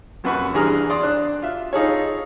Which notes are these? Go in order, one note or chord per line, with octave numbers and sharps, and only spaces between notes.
A#1 F#2 F#4 B4 B5 C#6
G2 E3 G#4 A#5 D#6 F6
D5 C6 D#6
D4 F#6
F4 E5
D#4 F4 G#4 A4 C#5